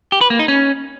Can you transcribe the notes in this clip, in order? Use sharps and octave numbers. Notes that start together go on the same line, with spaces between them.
G4
B4
A#3
D#4
C#4